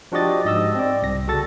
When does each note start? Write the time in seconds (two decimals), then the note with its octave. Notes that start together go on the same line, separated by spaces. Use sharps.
0.12 F3 D4 F#4 G4 D#5 A6
0.45 G#2 D#5 E6
0.75 C4 D5
1.02 C2 A#6
1.27 C#3 F#4 A4 A6